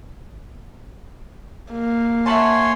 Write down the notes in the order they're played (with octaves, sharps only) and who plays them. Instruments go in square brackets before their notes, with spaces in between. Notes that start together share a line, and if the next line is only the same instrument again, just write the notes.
[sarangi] A#3
[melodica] C#5 G#5 C6 [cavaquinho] E5 F#5 A5